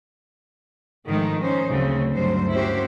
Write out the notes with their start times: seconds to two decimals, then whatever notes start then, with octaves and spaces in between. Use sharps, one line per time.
1.08 G#2 D#3 F3 G#3 A3 D#4
1.42 C#4 D#4 C5
1.72 D2 C#3 F#3 C4
2.13 D2 G2 F#3 G3 C5
2.54 A#3 C#4 E4 F#4 G4 C5